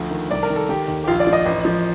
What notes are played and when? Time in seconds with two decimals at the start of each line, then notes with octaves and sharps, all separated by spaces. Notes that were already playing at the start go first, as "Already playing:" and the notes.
Already playing: D2 F3
0.11 D#3
0.30 C2 D5
0.43 A#4
0.50 D#3
0.56 A4
0.69 D#3 G4
0.88 D#2
1.04 G4
1.07 A#1 F4
1.20 D5
1.27 F3
1.33 D#5
1.46 A1
1.65 F3